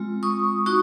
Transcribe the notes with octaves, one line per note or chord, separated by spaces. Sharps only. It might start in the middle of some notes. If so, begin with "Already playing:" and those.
Already playing: G#3 C4 F4
C#6 D#6
D#4 F#4 C#6 D#6